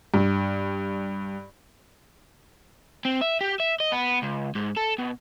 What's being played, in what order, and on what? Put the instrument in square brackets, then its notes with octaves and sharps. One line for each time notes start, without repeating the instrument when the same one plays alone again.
[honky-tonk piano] G2
[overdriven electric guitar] C4
E5
G4
E5
D#5
B3
C#2
G#2
A4
B2